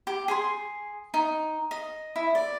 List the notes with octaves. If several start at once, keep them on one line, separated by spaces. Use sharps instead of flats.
G4
G#4 G#5 C6
D#4
D#5
E4
D5